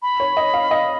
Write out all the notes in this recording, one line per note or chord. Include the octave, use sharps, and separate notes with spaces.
B5
C#5
D#5
F5
D#5